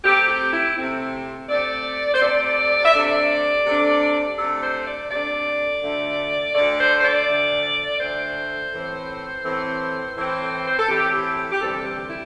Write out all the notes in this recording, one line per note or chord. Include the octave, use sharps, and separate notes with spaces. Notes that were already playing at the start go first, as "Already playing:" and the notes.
C3 A3 C4 G4
G4
E4
C3 A3 C4
C3 A3 C4 D5
C5
C3 A3 C4 D5
E5
C3 A3 D4 D5
C3 A3 D4
C3 A3 D4 A4
C5
D5
C3 A3 D4 D5
D2 D3 A3
D2 D3 A3 D5
C5
C5
D5
D2 D3 A3
D2 D3 A3 C5
A2 E3 C4
A2 E3 C4
A2 E3 C4
C5
A4
A2 E3 C4 G4
G4
G4
G4
D2 C3 E3 G3 C4 A4
G4
E4